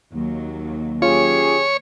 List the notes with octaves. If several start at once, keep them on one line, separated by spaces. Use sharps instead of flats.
D#2 F#3
C#4 F4 G4 G#4 C#5